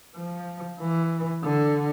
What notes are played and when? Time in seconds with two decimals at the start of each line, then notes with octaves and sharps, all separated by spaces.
0.16 F3
0.80 E3
1.43 D3